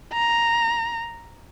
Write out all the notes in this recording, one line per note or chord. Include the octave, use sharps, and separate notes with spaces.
A#5